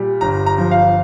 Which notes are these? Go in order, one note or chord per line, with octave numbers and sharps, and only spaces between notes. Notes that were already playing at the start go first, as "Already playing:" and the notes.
Already playing: A#2 G3
G1 A#5
A#5
F3
F5